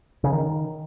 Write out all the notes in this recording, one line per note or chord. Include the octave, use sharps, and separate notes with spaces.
C#3
D#3